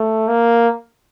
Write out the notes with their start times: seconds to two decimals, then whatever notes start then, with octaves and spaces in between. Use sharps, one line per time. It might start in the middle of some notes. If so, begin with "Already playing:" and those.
Already playing: A3
0.28 A#3